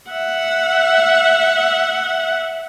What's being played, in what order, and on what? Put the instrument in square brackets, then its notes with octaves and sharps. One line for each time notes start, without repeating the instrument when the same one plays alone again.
[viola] E5 F#5